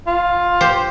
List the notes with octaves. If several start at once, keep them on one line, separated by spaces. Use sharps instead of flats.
F4
G4 C5